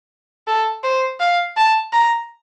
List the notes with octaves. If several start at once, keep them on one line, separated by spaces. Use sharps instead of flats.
A4
C5
F5
A5
A#5